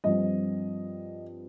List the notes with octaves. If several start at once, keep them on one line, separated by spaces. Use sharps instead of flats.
G2 F3 C4 D#5